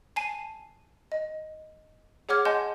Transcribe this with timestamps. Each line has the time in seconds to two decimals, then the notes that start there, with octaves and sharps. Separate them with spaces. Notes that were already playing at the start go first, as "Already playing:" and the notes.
0.16 G#5 A5 C7 D#7
1.12 D#5
2.29 G#4 C#5 F#5 D6 F6 G#6
2.45 D#5 F#5 G#5 A5 C6 G6